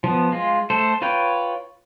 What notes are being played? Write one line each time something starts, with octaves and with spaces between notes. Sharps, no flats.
F3 B3
G#3 F4
A3 A4 C5
F4 B4 C#5 G5